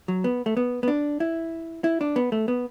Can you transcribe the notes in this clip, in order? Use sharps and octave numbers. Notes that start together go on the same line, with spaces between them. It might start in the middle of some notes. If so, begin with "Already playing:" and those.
F#3
B3
A3
B3
B3
D4
E4
E4
D4
B3
A3
B3